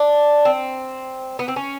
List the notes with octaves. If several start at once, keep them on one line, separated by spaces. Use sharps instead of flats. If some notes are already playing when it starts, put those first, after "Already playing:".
Already playing: D4
C4
B3
C4
C#4